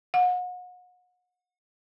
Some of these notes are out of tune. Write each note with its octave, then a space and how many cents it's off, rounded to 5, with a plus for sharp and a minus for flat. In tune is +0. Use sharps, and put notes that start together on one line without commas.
F#5 -35